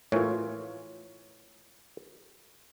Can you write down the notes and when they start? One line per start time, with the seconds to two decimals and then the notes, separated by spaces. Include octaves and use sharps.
0.12 A2 E3 F4 A#4 C#5